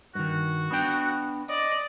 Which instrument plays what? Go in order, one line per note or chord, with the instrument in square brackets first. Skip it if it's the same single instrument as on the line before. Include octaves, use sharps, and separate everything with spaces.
[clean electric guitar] G2 D#3 [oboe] F#4
[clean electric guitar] B3 D4 G5
[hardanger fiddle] D5 [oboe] D#5